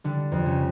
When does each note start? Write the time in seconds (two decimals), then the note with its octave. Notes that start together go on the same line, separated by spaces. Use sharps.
0.04 D3 G3 D4
0.32 F2
0.45 C#3 C#4